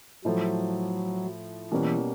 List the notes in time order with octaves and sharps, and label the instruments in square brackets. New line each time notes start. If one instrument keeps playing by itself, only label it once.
[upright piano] A2 F3 A3 [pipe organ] F#3
[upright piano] B2 G3 A#3 C#4 [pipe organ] E3